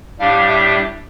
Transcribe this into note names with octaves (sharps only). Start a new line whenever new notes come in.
A2 G3 D4 G4 F5
E5